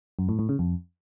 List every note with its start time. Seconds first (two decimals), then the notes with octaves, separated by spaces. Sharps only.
0.19 F#2
0.29 A2
0.39 A2
0.49 C#3
0.59 F2